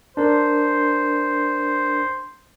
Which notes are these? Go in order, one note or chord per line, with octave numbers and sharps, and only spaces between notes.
D4 A#4 C5